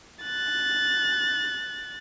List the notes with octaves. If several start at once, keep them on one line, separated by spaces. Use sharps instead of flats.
F#6 A6